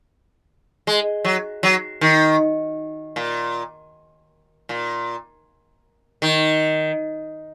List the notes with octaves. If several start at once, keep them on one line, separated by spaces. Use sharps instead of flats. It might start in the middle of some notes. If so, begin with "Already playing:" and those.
G#3
F#3
F#3
D#3
A#2
A#2
D#3